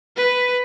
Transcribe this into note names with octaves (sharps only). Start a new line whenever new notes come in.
B4